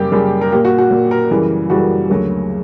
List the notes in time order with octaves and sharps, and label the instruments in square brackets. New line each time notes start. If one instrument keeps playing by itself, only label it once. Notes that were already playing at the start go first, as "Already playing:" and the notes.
Already playing: [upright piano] F#2 C#3 G3 A#3 G4
F#2 C#3 G3 A#3
A#4
A#3 G4
A#2
F#4
F#4
A#2 A#3
A#4
F#2 C#3 E3 G3 A#3
F#2 C#3 E3 G3 A#3 F#4
D2 C#3 F#3 A#3